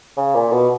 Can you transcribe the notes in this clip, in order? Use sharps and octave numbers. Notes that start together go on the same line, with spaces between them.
C#3
A#2
B2